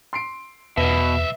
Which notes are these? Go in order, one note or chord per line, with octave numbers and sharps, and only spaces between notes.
C6 C7 D7
B1 E2 B2 B4 E5 G7